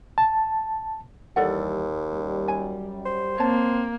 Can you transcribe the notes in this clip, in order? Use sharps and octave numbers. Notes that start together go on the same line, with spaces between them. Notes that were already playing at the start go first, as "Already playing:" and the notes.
A5
D#2 E3 G3 A4 D5 F#5
F#2 G3
G#5
C5
A#3 C4 C#5 A5